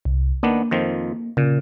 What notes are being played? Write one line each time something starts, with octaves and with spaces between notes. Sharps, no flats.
C2
D#3 A#3 B3 D4
F2 D#3 F3
A#2 C#3